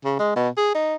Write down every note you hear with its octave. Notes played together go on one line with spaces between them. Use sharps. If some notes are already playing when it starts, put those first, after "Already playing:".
C#3
G#3
B2
G#4
D#4